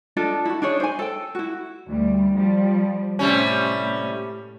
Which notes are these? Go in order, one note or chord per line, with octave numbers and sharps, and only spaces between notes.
D4 F4 A4 D#5
E4 F#4
D4 D#4 G#4 C#5
C5 G#5
A4 G5
E4 F#4
D2 G3
F3 G3
A2 C3 G3 C#4